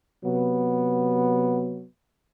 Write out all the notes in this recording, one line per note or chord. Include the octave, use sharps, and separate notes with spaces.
C3 F#3 B3